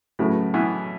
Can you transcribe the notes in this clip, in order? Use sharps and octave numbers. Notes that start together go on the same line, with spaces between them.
A2 C#3 F#3 A3 F#4 B4
B2 E3